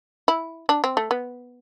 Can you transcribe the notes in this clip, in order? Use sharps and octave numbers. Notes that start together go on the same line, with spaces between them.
E4
D4
C4
A3
B3